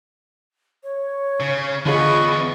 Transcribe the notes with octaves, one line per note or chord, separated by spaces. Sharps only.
C#5
C#3
E2 D3 B3 F4 G#4 D#5 C#6